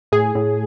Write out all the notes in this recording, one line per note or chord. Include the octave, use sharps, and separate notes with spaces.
A2 G#4
A2